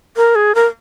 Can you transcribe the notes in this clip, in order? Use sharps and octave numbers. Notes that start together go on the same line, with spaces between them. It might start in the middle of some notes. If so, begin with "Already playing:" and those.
A#4
G#4
A#4